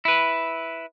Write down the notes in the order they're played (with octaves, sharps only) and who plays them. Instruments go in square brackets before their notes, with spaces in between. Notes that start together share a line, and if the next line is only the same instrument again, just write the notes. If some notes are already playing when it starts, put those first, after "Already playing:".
[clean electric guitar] E4 B4